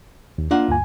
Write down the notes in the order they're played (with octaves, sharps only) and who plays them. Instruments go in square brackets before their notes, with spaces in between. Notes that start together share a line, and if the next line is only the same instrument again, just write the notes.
[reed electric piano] D#2
[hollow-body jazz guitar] A#3 F4 F#5 [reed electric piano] D4
[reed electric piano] D2 G2 G#5